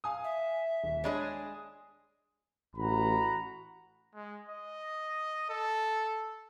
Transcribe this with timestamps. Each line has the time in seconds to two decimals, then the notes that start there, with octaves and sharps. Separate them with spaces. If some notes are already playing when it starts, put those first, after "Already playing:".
0.04 F5 G#5 D#6
0.24 E5
0.83 D#1
1.04 G#3 D4 G#4 C#5 D#5 B5
2.76 A1 F#4 A#5 B5
4.15 G#3
4.49 D#5
5.49 A4